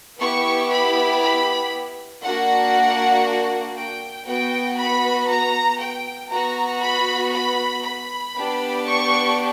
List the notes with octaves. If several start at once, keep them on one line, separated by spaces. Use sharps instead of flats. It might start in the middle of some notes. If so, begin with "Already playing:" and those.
B3 E4 G4 C#6
B5
B5
A#3 D4 F#4 F#5
G5
B3 F#4 G5
B5
A#5
G5
B3 F#4 A#5
B5
B5
B5
B3 D4 G4
C#6